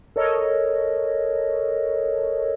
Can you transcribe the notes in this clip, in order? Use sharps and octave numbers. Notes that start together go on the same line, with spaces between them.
A4 A#4 C#5 D#5